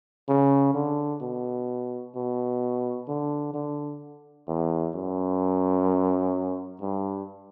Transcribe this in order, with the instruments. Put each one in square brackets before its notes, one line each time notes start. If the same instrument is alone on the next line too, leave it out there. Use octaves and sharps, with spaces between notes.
[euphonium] C#3
D3
B2
B2
D3
D3
E2
F#2
G2